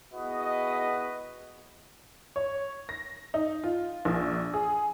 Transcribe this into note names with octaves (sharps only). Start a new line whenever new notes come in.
B3 E4 F#4 G#4 B4 D#5
C#5
A#6
D#4
F4
A#1
G#4